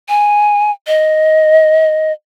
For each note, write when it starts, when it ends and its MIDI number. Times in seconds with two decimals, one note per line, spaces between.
0.09 0.71 80
0.87 2.12 75